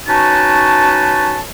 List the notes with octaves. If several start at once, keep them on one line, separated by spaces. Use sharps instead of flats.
C#4 D#4 F#4 B4 A5